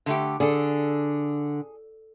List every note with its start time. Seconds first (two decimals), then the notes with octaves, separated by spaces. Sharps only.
0.06 D3 A3 G4
0.40 D3 G#4 A4